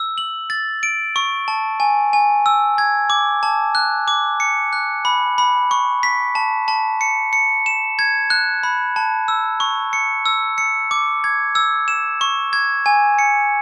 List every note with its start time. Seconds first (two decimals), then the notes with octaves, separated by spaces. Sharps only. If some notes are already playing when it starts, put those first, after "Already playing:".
Already playing: E6
0.18 F#7
0.50 A6
0.83 D7
1.16 C#6
1.48 A5
1.80 G#5
2.13 G#5
2.46 E6
2.78 G#6
3.10 D6
3.43 A5
3.75 F#6
4.08 D6
4.40 C#7
4.73 F#6
5.05 B5
5.38 B5
5.71 C#6
6.03 B6
6.35 A5
6.68 A5
7.01 C#7
7.33 C#7
7.66 E7
7.99 G#6
8.30 F#6
8.63 B5
8.96 A5
9.28 E6
9.60 C#6
9.93 C#7
10.26 E6
10.58 C#7
10.91 D6
11.24 G#6
11.55 E6
11.88 E7
12.21 C#6
12.53 G#6
12.86 G#5
13.19 C#7